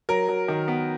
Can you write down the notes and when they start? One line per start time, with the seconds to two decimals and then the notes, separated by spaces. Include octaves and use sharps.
0.09 F#3 A#4
0.28 F#3
0.48 D#3
0.68 B3